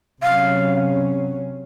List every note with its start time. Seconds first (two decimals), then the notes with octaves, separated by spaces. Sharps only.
0.22 C3 F#3 C#4 F5